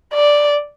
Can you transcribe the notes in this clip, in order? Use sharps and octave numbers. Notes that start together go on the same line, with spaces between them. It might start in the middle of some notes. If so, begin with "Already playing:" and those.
D5